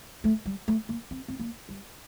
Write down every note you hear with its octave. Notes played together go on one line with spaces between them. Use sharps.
A3
G3
A3
A#3
C4
C4
A#3
G3